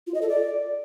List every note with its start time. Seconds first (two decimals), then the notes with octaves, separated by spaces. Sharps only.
0.07 F4
0.14 D#5
0.22 A4
0.29 D5